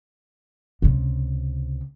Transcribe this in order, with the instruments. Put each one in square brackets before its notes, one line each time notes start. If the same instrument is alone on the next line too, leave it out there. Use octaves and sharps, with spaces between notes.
[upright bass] C#2 C3